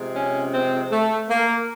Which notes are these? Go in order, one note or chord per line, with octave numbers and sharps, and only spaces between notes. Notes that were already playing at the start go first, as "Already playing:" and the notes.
Already playing: C3 F3 G#3
C#4
C4
A3
A#3